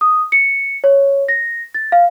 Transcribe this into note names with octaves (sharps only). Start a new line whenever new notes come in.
D#6
C#7
C#5
A#6
A6
F5